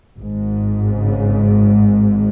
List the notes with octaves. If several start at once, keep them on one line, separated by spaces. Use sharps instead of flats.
G#1 G#2
C#3